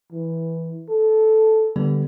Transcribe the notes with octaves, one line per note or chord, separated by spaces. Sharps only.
E3
A4
D3 G3 B3